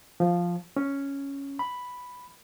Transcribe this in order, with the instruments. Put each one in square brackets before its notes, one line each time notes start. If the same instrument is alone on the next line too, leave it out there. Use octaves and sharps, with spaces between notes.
[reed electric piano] F3
C#4
B5